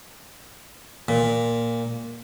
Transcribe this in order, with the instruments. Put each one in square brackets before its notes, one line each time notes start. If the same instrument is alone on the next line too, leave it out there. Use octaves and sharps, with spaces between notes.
[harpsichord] A#2